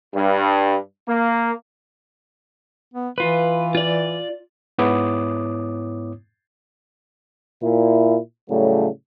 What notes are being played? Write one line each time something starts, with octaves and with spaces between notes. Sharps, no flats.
G2
A#3
B3
E3 F4 B4
F4 D5
G#2 B3 E4 C#5 D6 D#6
A#2 E4
A2 C#3 F#3 G3 A3